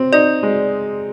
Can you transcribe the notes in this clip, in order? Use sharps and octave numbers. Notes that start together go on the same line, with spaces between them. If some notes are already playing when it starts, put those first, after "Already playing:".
Already playing: C4
D#4 D5
G#3